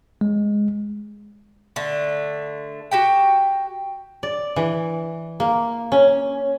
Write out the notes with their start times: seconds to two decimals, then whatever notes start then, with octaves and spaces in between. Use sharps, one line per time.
0.21 G#3
1.76 D3 A3
2.91 F#4 G4 G5
4.23 D5
4.56 E3
5.40 A#3
5.92 C#4